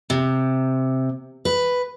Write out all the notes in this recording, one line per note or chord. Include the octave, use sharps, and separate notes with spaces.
C3
B4